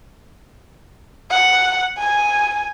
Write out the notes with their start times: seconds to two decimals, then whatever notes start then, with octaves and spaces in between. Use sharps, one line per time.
1.30 F#5
1.98 G#5